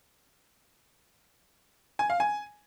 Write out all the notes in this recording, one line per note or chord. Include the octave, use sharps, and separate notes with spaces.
G#5
F5
G#5